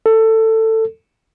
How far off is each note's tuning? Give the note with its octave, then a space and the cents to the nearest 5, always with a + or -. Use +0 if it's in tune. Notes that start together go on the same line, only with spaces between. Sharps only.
A4 +15